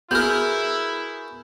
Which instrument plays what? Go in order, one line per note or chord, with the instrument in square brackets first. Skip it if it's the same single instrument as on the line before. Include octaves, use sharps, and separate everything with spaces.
[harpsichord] B3 A#4 [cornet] E4 [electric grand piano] F#4 G#4 G#5 [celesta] G6